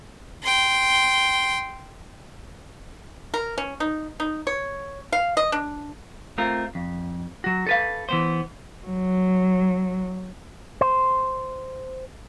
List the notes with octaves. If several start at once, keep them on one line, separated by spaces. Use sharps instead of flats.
G5 C6
A#4
C#4
D#4
D#4
C#5
F5
D#5
D4
A3 C4 F4 A#4
F2
F#3 F#4
A4 B4 F5
E3 B3 C5
F#3
C5